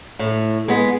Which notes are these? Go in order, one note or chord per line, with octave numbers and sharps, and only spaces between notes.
A2
G#3 B3